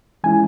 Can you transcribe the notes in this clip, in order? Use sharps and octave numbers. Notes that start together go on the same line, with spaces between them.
E3 G#3 C#4 E4 G#5